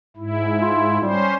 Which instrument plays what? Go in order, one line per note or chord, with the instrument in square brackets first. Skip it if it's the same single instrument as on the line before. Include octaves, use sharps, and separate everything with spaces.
[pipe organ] G#2 E4
[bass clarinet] F4
[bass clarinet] G3 [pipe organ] C#4 C5